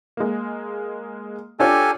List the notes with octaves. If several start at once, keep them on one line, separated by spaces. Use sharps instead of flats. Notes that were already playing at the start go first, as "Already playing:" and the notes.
G#3 A#3
D4 F4 G4 A4 C#5 G#5